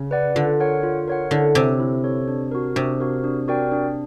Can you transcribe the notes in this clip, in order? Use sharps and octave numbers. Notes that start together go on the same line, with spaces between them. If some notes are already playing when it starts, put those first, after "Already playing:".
Already playing: C#3
B4 D5 F#5
D3 F4
A#4 C#5 F#5
F4
A#4 C#5 F#5
D3 E4
C3 A4 C#5
E4
A4 C#5
D4
F#4 A#4
C3 D4
F#4 A#4
D4
F#4 A#4 D5 G5
D4